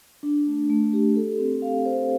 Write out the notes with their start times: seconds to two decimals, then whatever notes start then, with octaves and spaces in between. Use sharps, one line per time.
0.23 D4
0.47 A3
0.69 A3
0.93 G4
1.16 A4
1.39 C4
1.62 F5
1.86 C5